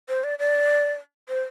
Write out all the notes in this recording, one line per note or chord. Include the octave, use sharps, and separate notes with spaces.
C5
D5
D5
C5